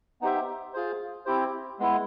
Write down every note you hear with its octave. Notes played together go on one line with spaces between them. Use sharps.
B3 D#4 G4 C5 E5
F4 G#4 C5
C4 E4 G4 C5
G#3 B3 E4